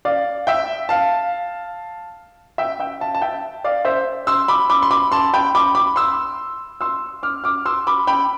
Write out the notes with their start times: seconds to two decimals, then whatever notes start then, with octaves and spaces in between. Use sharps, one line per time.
0.05 D5 F5
0.47 E5 G5
0.89 F5 A5
2.58 E5 G5
2.80 E5 G5
3.00 F5 A5
3.15 A5
3.22 E5 G5
3.64 D5 F5
3.85 C5 E5
4.27 C6 E6
4.48 B5 D6
4.70 B5 D6
4.82 C6
4.91 B5 D6
5.12 A5 C6
5.34 G5 B5
5.55 B5 D6
5.75 B5 D6
5.96 C6 E6
6.81 C6 E6
7.23 D6 F6
7.44 D6 F6
7.66 C6 E6
7.87 B5 D6
8.07 G5 B5